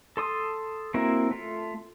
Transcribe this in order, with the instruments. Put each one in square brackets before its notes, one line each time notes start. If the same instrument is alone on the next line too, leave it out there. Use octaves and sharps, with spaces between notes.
[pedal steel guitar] A4 C6 D#6
A#3 C4 E4 F#4 A#4
A3 F4